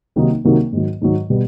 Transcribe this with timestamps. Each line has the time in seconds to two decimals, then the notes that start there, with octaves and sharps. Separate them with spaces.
0.16 C3 D#3 F#3 A#3 D#4
0.44 C3 D#3 F#3 A#3 D#4
0.73 G#2 D#3 F#3
1.02 G#2 D#3 F#3
1.30 B2 G3 B3